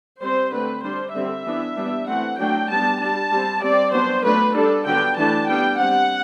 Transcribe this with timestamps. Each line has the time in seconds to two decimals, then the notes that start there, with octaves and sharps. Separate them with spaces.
0.22 G3 C4 C5
0.53 D3 A3 C4 B4
0.83 G3 D4 C5
1.15 D3 G3 C4 E5
1.46 E3 B3 D4
1.76 G3 B3 D4
2.07 E3 A3 C4 F#5
2.38 F#3 A3 D4 G5
2.69 G3 B3 D4 A5
3.00 G3 D4 A5
3.31 G3 C4
3.62 G3 C4 D5
3.93 F#3 B3 D4 C5
4.24 F#3 A3 D4 B4
4.55 G3 D4 A4
4.86 D3 F#3 B3 D4 G5
5.17 E3 A3 D4 A5
5.48 G3 B3 D4 G5
5.79 G3 C4 F#5